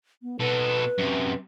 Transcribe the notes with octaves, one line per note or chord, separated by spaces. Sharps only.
B3
B2 A4 B4
F#2 C3